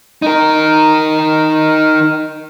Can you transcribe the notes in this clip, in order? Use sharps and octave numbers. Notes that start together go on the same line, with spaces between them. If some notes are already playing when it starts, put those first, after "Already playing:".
D#4 A#4